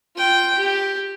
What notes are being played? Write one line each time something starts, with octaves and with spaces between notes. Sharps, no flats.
F4 G5
G4